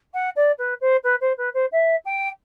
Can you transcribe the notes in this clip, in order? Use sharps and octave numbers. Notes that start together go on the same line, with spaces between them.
F#5
D5
B4
C5
B4
C5
B4
C5
E5
G5